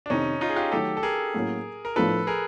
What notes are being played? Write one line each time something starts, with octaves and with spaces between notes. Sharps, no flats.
D4
F2 C3 D#3 C#4 D#4
D#4 F4
G#4
F4 G4
D#3 F#3 A3 G4 A4
A4
G#4 A#4
A2 F#3 A#3 C#4
A#4
A2 F3 A3 D4 F4 A4 B4
G#4 A#4